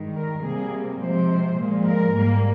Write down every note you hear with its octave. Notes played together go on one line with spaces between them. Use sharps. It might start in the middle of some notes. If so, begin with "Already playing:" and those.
Already playing: G2 D#3 G#3
A#4
C3 G3 A#3 G#4
C3 F3 G#3 C5
A#2 F3 G#3
A#4
G#2 G3 A#3